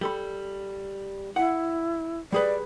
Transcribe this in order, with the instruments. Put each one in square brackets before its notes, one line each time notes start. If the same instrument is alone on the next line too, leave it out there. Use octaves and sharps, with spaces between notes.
[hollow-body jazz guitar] G3 A4 B5
[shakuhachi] E4 [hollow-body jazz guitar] F#5
[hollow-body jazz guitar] G3 G#4 B4 [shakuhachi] D5